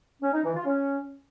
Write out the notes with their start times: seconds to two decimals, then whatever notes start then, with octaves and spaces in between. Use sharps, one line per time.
0.22 C#4
0.33 D#4
0.44 E3
0.55 F4
0.65 C#4